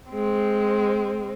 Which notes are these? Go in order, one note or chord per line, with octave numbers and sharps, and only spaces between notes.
G#3 C4